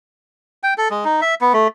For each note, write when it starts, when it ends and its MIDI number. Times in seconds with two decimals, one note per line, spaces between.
0.63 0.74 79
0.78 0.88 69
0.91 1.05 56
1.05 1.21 63
1.21 1.35 76
1.41 1.53 59
1.53 1.68 57